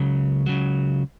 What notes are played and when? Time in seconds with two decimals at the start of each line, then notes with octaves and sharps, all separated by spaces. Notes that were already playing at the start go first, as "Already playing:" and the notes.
Already playing: C#2 C#3 F#3
0.46 C#2 C#3 F#3